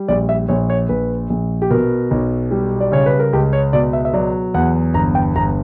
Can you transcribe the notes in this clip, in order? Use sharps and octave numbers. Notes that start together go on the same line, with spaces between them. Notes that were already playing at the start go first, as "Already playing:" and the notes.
Already playing: G3
A#1 D5
E5
A#1 C#5
C#5
A#1 B4
A#1
G4
B2 A#4
B1
G3
D5
C#3 C#5
B4
A#4
C#2 G4
C#5
B2 D5
E5
E5
F#3 D5
E2 F#5
G1 A#5
G5
G1 A#5